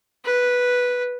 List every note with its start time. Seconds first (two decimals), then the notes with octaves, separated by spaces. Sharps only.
0.25 B4